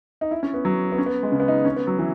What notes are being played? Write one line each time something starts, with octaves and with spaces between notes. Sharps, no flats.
D#4
E4
C#4
B3
F#3
B3
C#4
B3
G#3
C#3
B3
D#4
C#4
B3
F#3
E3